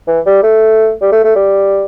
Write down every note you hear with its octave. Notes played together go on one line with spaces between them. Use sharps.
E3
G3
A3
G3
A3
A3
G3